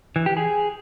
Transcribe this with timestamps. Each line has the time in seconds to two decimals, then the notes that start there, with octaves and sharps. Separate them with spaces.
0.16 E3
0.26 G4
0.37 G#4